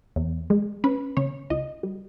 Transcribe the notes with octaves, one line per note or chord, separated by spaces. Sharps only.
E2
G#3
C#4 B4
C#3 C#5
C#2 D#5
G3